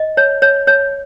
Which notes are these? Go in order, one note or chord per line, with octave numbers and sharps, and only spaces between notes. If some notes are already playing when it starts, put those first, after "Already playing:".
Already playing: D#5
C#5
C#5
C#5